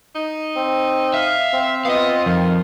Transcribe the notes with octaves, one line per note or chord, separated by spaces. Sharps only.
D#4
C4
E5 F5
C4
B3 F4 D#5 F5
F2 D#3